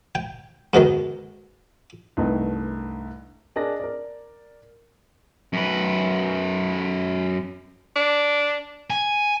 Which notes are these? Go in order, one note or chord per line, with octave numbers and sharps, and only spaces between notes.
G5
G#2 B2 D3 D#3
C2 G2 A3 D#4 B4 D#5
D4 G#4 A#4 D#5 A#6
A#4 D5
F#2 B4
D4
G#5